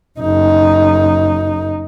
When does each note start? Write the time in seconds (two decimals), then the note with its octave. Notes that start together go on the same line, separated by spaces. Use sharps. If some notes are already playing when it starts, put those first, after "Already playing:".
0.20 F#1 D#4